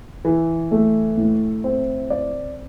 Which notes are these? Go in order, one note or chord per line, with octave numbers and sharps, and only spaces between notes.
E3
A3
A2
C4
D5